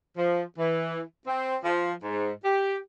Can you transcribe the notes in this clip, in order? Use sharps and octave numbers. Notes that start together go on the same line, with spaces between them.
F3
E3
C4
F3
G#2
G4